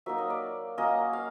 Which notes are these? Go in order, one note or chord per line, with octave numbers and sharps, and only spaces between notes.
F#3 A#3 D#4 E5
D#5
D5
F#3 A#3 C#4 D#5
F5